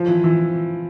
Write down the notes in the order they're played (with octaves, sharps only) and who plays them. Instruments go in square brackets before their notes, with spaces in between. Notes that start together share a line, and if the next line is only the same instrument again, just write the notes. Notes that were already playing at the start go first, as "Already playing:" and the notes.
Already playing: [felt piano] F3
E3
E3